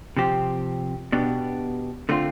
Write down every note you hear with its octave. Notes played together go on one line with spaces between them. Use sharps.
C3 F3 C4 G4
B2 B3 D4 G4
D3 A3 C4 F4